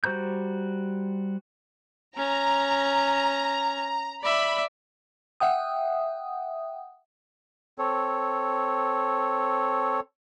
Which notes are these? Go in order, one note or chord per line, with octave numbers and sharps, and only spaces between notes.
G3 F#4 C5 A#5 G6
C#4 A#5
D5 E5 B5
E5 F#5 G5 D#6
C4 A4 C#5